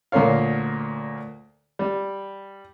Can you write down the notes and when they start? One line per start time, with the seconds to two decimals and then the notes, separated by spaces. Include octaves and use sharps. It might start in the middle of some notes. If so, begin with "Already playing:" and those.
0.12 D2 A#2 A#3 C#5 F5
1.79 G3